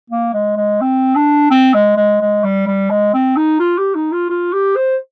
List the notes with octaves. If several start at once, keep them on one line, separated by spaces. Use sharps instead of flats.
A#3
G#3
G#3
C4
D4
C4
G#3
G#3
G#3
G3
G3
G#3
C4
D#4
F4
G4
D#4
F4
F4
G4
C5